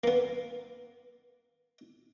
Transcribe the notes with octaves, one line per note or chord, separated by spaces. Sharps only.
A#3 B3